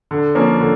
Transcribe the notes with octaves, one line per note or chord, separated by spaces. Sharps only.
D3
F3 A#3 C#4
D3